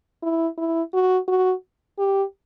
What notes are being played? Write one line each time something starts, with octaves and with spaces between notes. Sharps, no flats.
E4
E4
F#4
F#4
G4